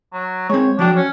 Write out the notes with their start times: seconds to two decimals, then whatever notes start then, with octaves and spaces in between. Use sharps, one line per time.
0.13 F#3
0.50 G#3 C4 C#5
0.79 F3 F#3 D4 G5
0.96 C#4